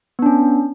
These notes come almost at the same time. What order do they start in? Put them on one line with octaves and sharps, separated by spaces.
B3 D4 C#4